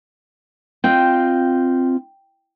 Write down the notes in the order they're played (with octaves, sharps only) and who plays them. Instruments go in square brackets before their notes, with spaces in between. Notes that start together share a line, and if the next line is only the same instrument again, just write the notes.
[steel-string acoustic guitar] C4 F4 D#5 [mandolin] G5